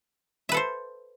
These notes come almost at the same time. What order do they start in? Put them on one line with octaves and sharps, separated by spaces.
E5 B4 A4 C5